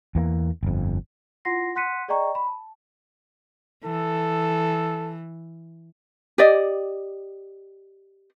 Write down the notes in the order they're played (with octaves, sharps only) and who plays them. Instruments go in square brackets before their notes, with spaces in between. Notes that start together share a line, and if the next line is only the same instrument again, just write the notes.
[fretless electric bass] E2 E3 A#3
G1 F2
[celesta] E4 F4 F#5 C6 A#6 C7
F#5 C6 F#6 B6 C#7 D#7
G#4 D5 D#5 G5 A#5 C#6
B5
A5
[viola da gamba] E3 [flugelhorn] A4
[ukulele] G4 D5 D#5